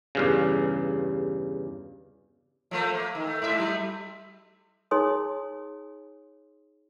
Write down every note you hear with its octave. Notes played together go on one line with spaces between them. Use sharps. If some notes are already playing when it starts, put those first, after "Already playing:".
E2 G2 C#3
F3 A3 A#3
A#3
D#3
A3
G#2 E5
F#3
D#4 G#4 C#5 G#5 C6 D#6